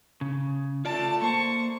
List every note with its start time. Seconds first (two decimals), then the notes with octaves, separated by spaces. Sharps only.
0.21 C#3
0.85 A3 F4 D5 A5
1.22 A#3 C5 C#6